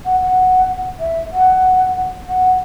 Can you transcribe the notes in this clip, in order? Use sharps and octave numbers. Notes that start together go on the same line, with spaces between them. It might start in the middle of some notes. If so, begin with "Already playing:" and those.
F#5
F#5
E5
F#5
F#5